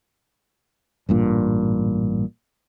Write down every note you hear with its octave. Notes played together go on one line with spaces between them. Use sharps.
A1 G2 A#2